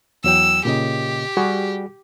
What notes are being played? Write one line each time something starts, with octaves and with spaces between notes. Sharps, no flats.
E2 F#3 G5 E6
A#2 C#3 G4 D#5
G3 F#4 G#4